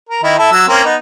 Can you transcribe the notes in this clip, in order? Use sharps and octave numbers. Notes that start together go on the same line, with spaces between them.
A#4
D#3 D#4 E4
E4 A4 E5
F#3 E6
A#3 C4 C#4
B3 D#4